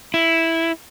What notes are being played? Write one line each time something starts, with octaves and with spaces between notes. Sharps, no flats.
E4